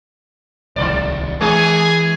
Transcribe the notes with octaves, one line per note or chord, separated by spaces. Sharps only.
D1 C2 D#3 D5
E3 G#3 G#4 G#5